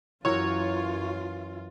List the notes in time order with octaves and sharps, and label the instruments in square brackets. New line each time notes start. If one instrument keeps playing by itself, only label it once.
[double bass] F#2 [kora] E3 F#3 A#4 [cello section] F4 [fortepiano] C#5